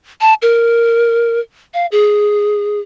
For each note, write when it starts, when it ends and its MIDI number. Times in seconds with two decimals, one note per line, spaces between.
0.21 0.34 81
0.42 1.40 70
1.74 1.86 77
1.92 2.80 68